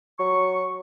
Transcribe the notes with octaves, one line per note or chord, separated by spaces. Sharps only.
F#3 C#6